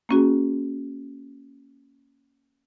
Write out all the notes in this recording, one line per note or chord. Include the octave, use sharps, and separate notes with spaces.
A#3 C#4 F#4 G#4